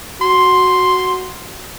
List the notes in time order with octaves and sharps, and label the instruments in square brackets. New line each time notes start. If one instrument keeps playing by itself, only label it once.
[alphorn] F#4 [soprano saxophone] C6